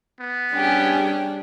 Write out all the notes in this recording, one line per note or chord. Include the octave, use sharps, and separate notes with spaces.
B3
G3 C#4 D4 G4 G#4